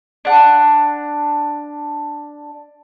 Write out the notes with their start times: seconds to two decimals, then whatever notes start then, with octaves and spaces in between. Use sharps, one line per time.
0.25 D4 F#5